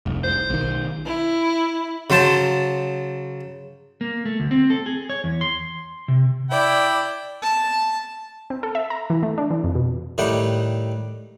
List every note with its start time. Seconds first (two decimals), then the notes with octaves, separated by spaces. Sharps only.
0.06 F1 C2
0.24 C5
0.50 B1 D#3
1.06 E4
2.10 C#3 F#3 C5 A5
4.01 A#3
4.25 A3
4.40 D2
4.51 C4
4.70 A4
4.86 G#4
5.10 C#5
5.24 E2
5.41 C6
6.08 C3
6.51 E4 D5 G5
7.42 A5
8.50 C4
8.63 A4
8.75 E5
8.90 A#5
9.10 E3
9.23 A3
9.38 D4
9.51 E3
9.64 F2
9.75 B2
10.18 A2 D#3 G3 F#5 G5